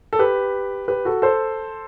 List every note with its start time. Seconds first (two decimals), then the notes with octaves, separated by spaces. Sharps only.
0.13 A4
0.19 G4 B4
0.88 G4 B4
1.05 F#4 A4
1.22 A4 C5